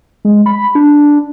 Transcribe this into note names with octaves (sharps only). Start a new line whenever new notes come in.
G#3
B5
D4